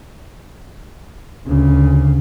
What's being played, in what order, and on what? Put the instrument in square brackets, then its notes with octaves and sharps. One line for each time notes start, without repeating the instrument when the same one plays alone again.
[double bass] D2 C#3